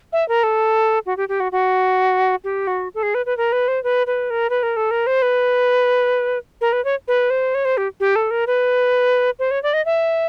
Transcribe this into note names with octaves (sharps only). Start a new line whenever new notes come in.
E5
A#4
A4
F#4
G4
G4
F#4
F#4
G4
F#4
A4
G#4
B4
B4
A#4
B4
C5
B4
B4
A#4
B4
A#4
A4
A#4
C5
B4
A#4
B4
C#5
B4
C5
C#5
C5
G4
G4
A4
A#4
B4
C5
C#5
D5
D#5
E5